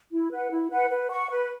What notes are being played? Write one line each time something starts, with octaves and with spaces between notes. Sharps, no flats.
E4
B4 F#5
E4
B4 F#5
B4
F#5 C#6
B4